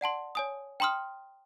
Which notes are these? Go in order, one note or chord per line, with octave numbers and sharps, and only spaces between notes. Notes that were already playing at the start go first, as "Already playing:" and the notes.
D5 F#5 A5 C6
C#5 G#5 D#6
G5 A#5 C6 D#6 F6